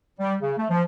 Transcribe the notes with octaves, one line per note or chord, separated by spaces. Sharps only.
G3
C#3
A3
F3